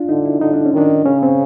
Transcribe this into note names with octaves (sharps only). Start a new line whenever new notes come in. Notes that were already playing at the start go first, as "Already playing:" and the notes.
Already playing: D4 F4
D3 D#4
E4
D3 D#4
D4
C#4
D#3 D4
C#3 C#4
C4